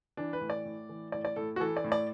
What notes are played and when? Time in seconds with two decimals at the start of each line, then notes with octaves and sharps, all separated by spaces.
0.17 E3 D4
0.33 B4
0.41 A2
0.50 D5
0.65 A2
0.89 E3
1.12 A2 D5
1.25 D5
1.36 A2 A4
1.56 F#4
1.60 E3 A4
1.77 D5
1.84 A2
1.92 D5